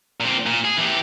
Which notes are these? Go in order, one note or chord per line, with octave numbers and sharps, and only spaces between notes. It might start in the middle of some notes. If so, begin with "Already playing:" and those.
A#2 C4
A#2
G#4
E3 G4